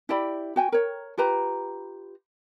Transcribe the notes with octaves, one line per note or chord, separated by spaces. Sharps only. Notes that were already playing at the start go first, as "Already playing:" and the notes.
E4 G4 D5 B5
F#4 G5 G#5
A#4 C#5
F4 G4 B4 A#5